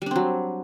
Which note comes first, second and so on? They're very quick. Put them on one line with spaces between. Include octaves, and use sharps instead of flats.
G3 D4 C4 F#3